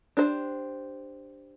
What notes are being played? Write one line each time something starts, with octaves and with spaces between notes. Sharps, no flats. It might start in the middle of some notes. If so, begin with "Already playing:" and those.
D4 G4 C5